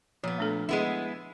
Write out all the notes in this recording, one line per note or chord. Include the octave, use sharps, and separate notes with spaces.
A#2 F3 B3
A3 D4 A4
G#3 B3 E4